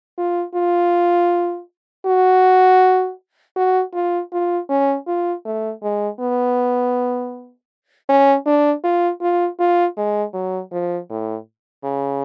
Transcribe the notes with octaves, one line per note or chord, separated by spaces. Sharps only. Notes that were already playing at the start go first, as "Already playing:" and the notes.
F4
F4
F#4
F#4
F4
F4
C#4
F4
A3
G#3
B3
C#4
D4
F4
F4
F4
G#3
F#3
F3
A2
C#3